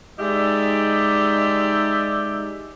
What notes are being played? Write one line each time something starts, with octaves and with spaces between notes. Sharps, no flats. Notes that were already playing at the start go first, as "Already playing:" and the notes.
G#3 D#4 G4 D5 E5